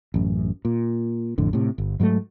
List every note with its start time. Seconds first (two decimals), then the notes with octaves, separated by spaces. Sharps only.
0.14 A1 F#2
0.65 A#2
1.38 A1 F2 A2 D3
1.53 A2 C3
1.78 G1
2.00 G#2 F#3 G3 A3